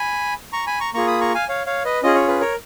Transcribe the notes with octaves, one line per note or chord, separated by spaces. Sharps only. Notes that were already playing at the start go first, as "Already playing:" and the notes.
Already playing: G#5 B5
A#5 C#6
G#5 B5
A#5 C#6
A#3 F4 G#4 A#5 C#6
B5 D#6
A#5 C#6
F5 G#5
C#5 F5
C#5 F5
B4 D#5
C#4 F4 G#4 D#5
C#5
B4
A#4 C#5